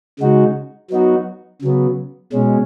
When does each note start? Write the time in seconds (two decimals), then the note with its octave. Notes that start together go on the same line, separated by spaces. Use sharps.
0.19 C#3 G#3 D#4 F#4
0.90 F#3 B3 D#4 F#4
1.62 C#3 F#3 B3
2.33 B2 G#3 C#4